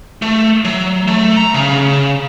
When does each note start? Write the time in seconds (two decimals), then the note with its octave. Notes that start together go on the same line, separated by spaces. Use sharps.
0.22 A3
0.65 F#3
1.07 A3
1.37 A#5
1.54 C#3